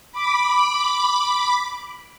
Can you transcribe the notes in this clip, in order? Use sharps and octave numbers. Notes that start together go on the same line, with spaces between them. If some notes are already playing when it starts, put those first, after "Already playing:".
B5 D6